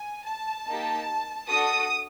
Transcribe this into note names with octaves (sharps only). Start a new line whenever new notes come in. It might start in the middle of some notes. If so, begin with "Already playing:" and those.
Already playing: G#5
A5
A#3 D#4 G4
D4 F#4 A4 D#6